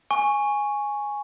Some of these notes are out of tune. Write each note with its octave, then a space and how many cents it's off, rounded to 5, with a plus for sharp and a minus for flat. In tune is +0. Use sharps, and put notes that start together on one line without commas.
G#5 +0 C#6 +0